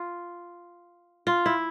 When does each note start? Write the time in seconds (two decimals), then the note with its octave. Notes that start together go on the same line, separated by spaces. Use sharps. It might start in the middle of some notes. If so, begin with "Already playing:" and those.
Already playing: F4
1.27 F4
1.46 E4